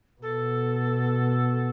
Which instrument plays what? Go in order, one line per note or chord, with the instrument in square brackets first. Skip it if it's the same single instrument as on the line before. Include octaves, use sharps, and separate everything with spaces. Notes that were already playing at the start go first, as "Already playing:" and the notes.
[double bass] B2 [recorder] A4